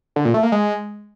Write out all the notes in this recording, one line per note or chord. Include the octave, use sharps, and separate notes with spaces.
D3
A#2
A3
A#3
G#3